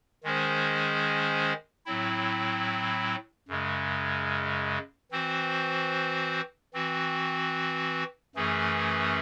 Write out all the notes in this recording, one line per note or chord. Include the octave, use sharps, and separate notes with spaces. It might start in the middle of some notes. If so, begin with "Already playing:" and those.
D#3 G#3 C#4 G#4 C5
A2 F#3 C4 E4
F#2 C#3 G#3
E3 C4 F#4 C5
E3 C4 F#4
F#2 E3 A3 C#4 G#4